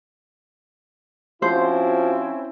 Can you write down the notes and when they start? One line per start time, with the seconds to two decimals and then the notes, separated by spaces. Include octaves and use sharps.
1.42 F3 C4 C#4 E4 F#4 C5